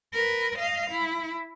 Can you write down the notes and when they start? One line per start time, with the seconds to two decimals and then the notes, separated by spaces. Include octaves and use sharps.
0.13 A#4 B4
0.58 D#5 F5
0.91 E4